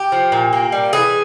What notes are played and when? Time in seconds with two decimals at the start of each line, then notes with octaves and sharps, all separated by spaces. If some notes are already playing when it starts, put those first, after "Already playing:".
Already playing: G4
0.12 F3
0.32 A#2
0.53 A#3
0.72 G3
0.93 E3 G#4